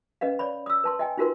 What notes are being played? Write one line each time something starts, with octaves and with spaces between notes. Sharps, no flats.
C#4 B4 D#5 F5
C#5 D5 B5
D#6 E6
B4 A5 C6
D#5 G5 G#5
D#4 F4 F#4 A#4 B4 C6